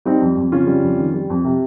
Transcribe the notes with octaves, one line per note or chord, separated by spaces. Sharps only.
G3 C4 D#4
F2
F2
C#3 C#4 F4
G3
F2
D#3
G3
F2
C3